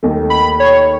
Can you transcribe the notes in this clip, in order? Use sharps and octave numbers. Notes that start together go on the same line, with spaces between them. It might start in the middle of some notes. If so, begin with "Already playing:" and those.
D#2 D#3 A3
B5
C#5